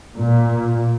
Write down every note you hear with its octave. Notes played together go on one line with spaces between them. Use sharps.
A#2